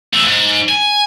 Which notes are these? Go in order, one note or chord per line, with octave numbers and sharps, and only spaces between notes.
E2 A3
G#2
G#5